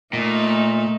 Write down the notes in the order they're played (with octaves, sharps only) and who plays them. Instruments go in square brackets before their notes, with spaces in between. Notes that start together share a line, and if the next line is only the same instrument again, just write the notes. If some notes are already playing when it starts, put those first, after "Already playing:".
[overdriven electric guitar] A#2 [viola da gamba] A3 D#4